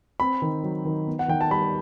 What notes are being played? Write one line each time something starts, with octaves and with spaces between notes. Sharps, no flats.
C4 B5
D#3
F#3
D#3
B3
F#5
D#3 G5
A5
G3 B5